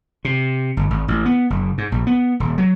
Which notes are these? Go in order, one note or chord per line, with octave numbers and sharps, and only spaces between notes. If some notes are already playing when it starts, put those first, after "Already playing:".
C3
G1
G#1
A1
B3
F#1
G#2
A#1
B3
D#1
F#3